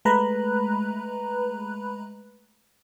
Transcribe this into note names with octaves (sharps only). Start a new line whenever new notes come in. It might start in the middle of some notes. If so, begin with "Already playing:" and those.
G#3 A3 B4 A#5 B5 F#6